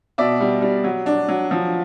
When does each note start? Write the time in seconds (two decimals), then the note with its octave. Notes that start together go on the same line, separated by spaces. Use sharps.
0.18 B2 D5 E5
0.40 G3
0.62 G3
0.84 F#3
1.06 D4
1.29 F#3
1.51 F3